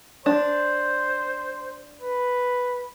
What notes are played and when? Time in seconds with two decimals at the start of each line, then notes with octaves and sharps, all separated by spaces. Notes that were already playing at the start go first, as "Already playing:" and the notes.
0.26 D4 C5
2.01 B4